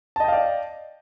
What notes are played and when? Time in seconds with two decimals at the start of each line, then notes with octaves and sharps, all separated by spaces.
0.16 A5
0.20 D#5
0.24 G5
0.28 F5
0.32 D5